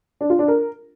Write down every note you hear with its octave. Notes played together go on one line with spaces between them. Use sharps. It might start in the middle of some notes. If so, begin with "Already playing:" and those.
D4
F4
D4
A#4